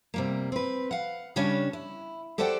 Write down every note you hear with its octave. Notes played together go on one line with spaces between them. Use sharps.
C3 G3 A#3
C4 B4
F5 F#5
C#3 G3 C#4 D4 C#5
E4
G4 A4 C5 D5 F#5 G5